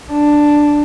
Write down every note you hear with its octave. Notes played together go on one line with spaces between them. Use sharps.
D4